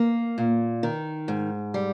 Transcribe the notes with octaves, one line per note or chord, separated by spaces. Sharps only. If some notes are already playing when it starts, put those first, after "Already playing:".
Already playing: A#3
A#2
D#3
G#2
G3